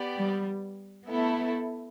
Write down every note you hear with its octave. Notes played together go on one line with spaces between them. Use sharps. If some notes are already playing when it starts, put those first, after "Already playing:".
Already playing: B3 G4 D5
G3
A3 B3 E4 A4 E5